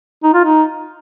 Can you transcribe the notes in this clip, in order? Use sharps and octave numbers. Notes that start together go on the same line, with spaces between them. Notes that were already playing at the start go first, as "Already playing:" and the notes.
D#4
F4
D#4